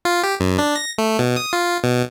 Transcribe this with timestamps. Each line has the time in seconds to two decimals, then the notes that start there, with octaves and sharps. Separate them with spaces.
0.05 F4
0.23 G4
0.40 F#2
0.59 D4
0.75 A#6
0.98 A3
1.19 B2
1.37 D#6
1.53 F4
1.84 B2